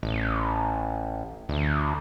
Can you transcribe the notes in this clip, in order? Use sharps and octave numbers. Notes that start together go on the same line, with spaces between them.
A1
D2